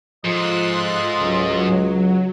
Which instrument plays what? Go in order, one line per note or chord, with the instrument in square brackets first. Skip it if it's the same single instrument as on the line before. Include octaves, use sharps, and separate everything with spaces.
[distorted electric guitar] G#2 [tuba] F3 [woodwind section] F4 A4 D#5 [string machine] C6 F#6
[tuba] C#2 [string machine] F#3